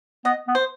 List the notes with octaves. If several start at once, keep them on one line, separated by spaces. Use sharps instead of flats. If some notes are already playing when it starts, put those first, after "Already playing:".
B3 D#5
B3
C5